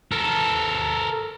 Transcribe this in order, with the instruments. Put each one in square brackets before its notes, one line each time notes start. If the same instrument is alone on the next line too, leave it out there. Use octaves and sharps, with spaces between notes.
[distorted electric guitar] A4 A#4